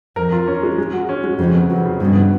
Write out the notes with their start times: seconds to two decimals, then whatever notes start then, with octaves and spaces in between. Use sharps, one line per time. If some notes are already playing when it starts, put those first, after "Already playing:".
0.16 F2 A#4
0.32 F4
0.47 C#4
0.63 G#3
0.78 G#3
0.93 F#4
1.09 C#4
1.24 G#3
1.39 F2 C#3
1.55 B3
1.69 F2 F#3
1.85 C#3
2.00 G2 B2
2.16 B3